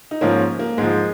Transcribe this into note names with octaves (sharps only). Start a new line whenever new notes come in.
D#4
G#2 F3 A#3 C#4
A#3
G#2 F3 G#3